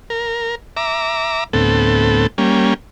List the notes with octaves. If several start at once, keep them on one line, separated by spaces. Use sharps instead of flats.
A#4
E5 A#5 D6
D2 A2 B3 C4 A4
G3 A#3 C#4